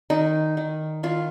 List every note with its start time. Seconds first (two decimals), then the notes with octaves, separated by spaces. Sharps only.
0.10 D#3 D#4
0.57 D#3
1.03 D#3 F4